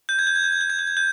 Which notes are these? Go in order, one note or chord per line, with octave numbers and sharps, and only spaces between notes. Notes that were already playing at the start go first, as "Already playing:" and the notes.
G6
G#6
G6
G#6
G6
G#6
G6
G#6
G6
G#6
G6